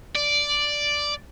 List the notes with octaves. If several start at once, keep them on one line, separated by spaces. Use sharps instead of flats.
D5